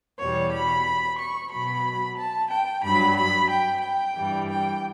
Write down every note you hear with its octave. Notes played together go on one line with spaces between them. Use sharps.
E2 B2 G3 C#5
B5
C#6
B2 F#3 B5
A5
G5
G2 F#3 B5
B5
G5
G5
G2 E3 G3
G5